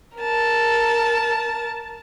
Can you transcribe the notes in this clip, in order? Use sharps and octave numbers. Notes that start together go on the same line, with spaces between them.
A#4 A5